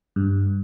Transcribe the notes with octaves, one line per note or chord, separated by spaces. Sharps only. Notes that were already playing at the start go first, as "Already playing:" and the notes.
G2